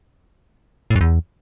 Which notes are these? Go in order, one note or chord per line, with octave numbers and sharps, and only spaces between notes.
A2
F#2
E2